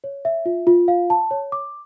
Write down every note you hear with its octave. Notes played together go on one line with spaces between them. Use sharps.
C#5
E5
F4
F4
F5
A5
C#5
D6